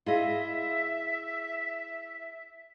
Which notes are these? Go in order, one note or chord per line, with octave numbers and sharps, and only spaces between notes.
E4 F4 G#4 D#5 E5